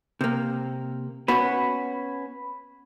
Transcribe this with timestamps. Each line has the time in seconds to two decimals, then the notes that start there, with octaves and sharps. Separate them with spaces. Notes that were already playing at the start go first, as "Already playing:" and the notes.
0.21 C3 A#3
1.28 B3 C#4 F#4 B5